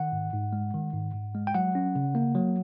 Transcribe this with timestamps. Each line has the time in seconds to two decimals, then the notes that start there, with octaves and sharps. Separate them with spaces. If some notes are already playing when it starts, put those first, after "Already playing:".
Already playing: D#3 F#5
0.12 G#2
0.33 G#2
0.53 G#3
0.74 D#3
0.93 G#2
1.14 G#2
1.35 G#3
1.47 G5
1.54 F#3 F#5
1.75 C#4
1.96 C#3
2.15 A#3
2.35 F#3